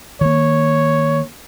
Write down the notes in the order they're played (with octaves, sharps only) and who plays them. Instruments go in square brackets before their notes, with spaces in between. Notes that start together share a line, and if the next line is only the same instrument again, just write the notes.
[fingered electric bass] D#3 A#3 [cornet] C#5